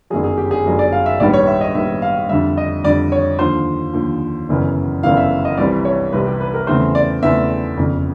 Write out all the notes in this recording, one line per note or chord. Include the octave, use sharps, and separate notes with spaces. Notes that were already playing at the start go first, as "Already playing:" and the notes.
G1 F#2 D#3 F#3 G#4
G#4
G4
G#4
G1 F#2 D#3 F#3
D5
F5
E5
A#1 G#2 D#3 G3 B3 D5
C#5
E5
D#5
A#1 G#2 D#3 G3 B3 E5
F5
F2 D3 G3 E5
D#5
F2 D3 G3 D5
C#5
D#2 D3 F3 C5
D#2 D3 F3
G1 F#2 C#3 E3
G1 F#2 C#3 E3 F5
E5
D#5
C2 C3 E3 G3 C4 D5
C#5
C2 C3 E3 G3 C4 B4
G4
B4
A#4
E2 C#3 E3 A3 C4 C5
D5
E2 C#3 E3 A3 C4 E5
G1 F2 C#3